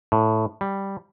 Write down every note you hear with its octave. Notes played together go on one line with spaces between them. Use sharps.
A2
G3